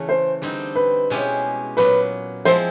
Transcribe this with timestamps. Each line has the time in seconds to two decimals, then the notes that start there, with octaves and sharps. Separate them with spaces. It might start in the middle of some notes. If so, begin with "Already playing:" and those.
Already playing: C#3 E3 A3
0.09 C5
0.42 D3 G3 C4 D#4
0.76 B4
1.10 B2 G#3 C#4 E4 G4
1.77 A#2 F#3 B3 B4
2.45 F3 G#3 C4 E4 C5